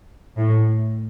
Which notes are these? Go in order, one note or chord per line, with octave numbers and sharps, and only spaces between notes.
A2